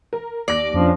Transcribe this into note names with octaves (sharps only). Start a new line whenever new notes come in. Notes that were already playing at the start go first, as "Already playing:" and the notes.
A#4
D#2 D5 D6 A#6
F2 F3 C#4 D4